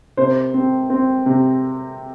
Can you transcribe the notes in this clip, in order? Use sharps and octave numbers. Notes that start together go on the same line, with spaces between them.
C3 C5
C4
C4
C3